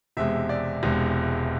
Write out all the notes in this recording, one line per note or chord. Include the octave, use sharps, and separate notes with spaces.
E1 E2 C3 G#3 E5
D5
E1 E2 C3 G#3